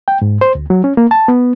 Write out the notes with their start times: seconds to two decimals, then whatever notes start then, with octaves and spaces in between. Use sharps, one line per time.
0.08 G5
0.22 G#2
0.41 C5
0.55 D2
0.70 F#3
0.84 C#4
0.97 A#3
1.11 A5
1.28 B3